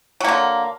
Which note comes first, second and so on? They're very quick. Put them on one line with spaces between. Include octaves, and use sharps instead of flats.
F#3 A#3 D3